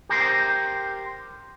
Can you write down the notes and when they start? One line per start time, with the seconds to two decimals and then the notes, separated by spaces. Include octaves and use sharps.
0.09 G4 A#4 C5